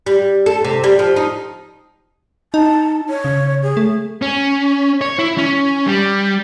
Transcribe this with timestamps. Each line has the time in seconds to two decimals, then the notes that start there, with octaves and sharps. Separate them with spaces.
0.06 G3
0.46 A4
0.64 C3
0.84 G3
0.99 F3
1.16 D#4
2.54 D#4 A5
3.09 C#5
3.24 C#3
3.63 G#4
3.77 A3
4.22 C#4
5.01 C#5
5.19 E4
5.38 C#4
5.86 G3